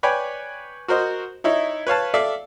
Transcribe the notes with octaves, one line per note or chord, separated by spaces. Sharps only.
B4 C#5 D5 G5 G#5 B5
F#4 A#4 C5 D#5
D#4 E4 C#5
B4 C#5 F5 A5
A4 D5 E5 F5